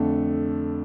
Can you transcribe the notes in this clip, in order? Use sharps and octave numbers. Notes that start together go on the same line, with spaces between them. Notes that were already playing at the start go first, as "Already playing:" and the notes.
Already playing: F2 D3 A3